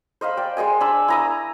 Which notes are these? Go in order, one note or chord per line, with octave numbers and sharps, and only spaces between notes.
C5 D#5 F5 B5
D5 G5
G#3 C5 D#5 G#5
D4 B5 E6
E4 A#5 D#6